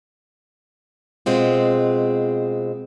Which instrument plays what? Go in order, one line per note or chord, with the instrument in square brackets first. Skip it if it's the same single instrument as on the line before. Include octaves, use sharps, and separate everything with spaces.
[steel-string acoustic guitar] B2 G#3 C4 F4